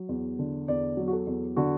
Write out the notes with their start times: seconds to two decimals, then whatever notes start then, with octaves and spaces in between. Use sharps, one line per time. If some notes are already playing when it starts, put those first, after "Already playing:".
Already playing: F#3
0.09 E2
0.39 D3
0.68 E2 D5
0.97 F#3
1.08 F#4
1.13 A4
1.27 E2
1.56 D3 F#4